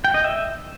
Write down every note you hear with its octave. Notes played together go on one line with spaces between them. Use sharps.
G5
D#5
E5